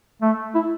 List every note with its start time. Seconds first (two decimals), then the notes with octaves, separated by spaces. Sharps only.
0.22 A3
0.55 E4